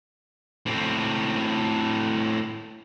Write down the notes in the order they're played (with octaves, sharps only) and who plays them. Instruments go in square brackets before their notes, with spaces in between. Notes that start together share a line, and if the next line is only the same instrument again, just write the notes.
[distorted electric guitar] A2 C4